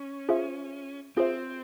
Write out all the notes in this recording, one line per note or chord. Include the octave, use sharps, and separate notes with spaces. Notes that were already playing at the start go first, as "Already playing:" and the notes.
Already playing: C#4
F4 G#4 C5 E5
C4 F4 G#4 C5 E5